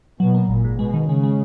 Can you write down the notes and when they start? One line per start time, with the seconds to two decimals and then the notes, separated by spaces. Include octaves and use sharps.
0.20 B2 F#3
0.34 A#3
0.49 G#1 A#2
0.64 G#2
0.79 B2 G#3
0.94 D#3
1.09 C#3 G#3
1.23 G#3